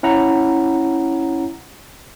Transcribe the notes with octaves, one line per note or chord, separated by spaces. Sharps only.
C#4 E4 F#5 A#5